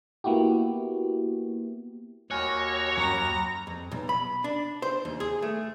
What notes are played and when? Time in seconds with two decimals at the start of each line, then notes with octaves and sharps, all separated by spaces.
0.24 A#3 B3 E4 F#4 G4
2.31 D#2 F#4 C#5 G#5 F6 F#6 A#6
2.97 F#2 F#3 A#5 B5
3.67 F2
3.92 B1
4.09 B5
4.44 D4
4.82 C5
5.05 D#2
5.20 G#4
5.42 A3